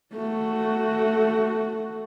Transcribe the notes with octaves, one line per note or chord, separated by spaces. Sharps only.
A3 F#4